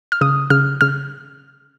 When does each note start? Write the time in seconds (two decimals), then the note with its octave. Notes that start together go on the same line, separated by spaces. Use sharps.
0.12 F6
0.21 C#3 D#6
0.50 C#3 F6
0.81 C#3 F6